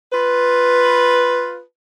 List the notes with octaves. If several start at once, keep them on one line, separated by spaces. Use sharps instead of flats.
F4 B4